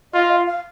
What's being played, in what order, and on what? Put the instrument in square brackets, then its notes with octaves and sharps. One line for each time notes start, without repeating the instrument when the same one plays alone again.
[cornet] F4 [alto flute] D#5
[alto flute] F5
F5